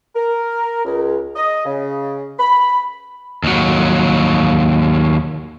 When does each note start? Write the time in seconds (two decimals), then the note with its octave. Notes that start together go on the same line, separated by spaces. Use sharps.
0.16 A#4
0.85 C#2
1.36 D#5
1.65 C#3
2.39 B5
3.44 D#2 F#3